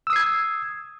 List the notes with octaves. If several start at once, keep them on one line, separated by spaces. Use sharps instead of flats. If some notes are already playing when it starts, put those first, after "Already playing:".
D#6 E6 G#6 C7